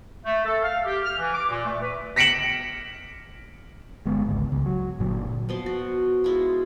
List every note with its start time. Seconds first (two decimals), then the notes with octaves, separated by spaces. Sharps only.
0.24 A3
0.45 A4
0.62 F5
0.85 G4
1.03 F6
1.18 E3
1.33 D6
1.49 A#2
1.65 A3
1.81 B4
2.16 A#6 B6 C#7 D7 E7 F#7
4.05 G1 G2 G#3 B3
4.27 G#1 C#2
4.52 C#2
4.66 F#3
4.99 G1 A#2 F#3
5.49 B2 F3 C6
5.66 F#4
6.24 G#3 E4 F4